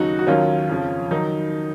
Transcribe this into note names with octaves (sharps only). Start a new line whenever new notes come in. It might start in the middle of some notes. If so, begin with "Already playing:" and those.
Already playing: D#2 C#3 F#3 D#4 F#4
F#4
D#2 D#3 F#3 C#4 F4
F2 C#3 F3
D#3 F#3 D#4